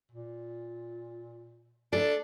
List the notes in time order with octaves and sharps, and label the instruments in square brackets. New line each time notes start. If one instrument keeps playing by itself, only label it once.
[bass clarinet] A#2
[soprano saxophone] D4 [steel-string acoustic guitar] A4